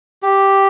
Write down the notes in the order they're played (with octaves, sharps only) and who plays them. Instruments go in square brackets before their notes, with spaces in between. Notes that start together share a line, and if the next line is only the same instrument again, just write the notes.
[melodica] G4